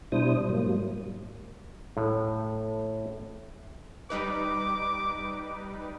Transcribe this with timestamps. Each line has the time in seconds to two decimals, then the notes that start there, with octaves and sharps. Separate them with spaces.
0.12 B2 G3 D4 E4 C5 D#6
0.49 G#2 F#3 G3 A#3
1.97 A2
4.10 G3 D#4 B4 D6